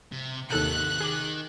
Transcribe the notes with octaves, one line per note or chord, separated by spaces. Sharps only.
C3
D#2 C3 D#3 A4 F#6 G6
D#3 G#4 D6